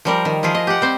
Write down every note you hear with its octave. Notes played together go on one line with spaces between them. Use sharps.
F3 G3 A#4
D#3
F3 E4 F4 G#4
D#5
G4 F#5
G3 C4 C5